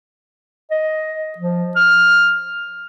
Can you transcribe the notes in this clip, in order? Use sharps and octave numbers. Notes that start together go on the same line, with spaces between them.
D#5
F3
F6